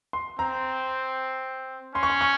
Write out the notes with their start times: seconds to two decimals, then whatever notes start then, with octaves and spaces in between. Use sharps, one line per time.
0.13 C6
0.39 C4 A#5
1.95 C#4 C6
2.03 C#6
2.10 C6
2.21 C#6